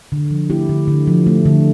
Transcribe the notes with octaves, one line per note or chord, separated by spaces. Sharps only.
D3
F3
A3 E4 G4
D3
D3
F3
A3
D3